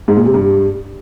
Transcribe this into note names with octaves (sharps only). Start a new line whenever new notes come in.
G#2
A#2
C3
G2